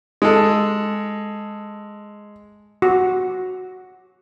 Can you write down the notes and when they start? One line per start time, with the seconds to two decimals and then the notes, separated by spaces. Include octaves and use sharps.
0.22 G#3 A4
2.82 F#4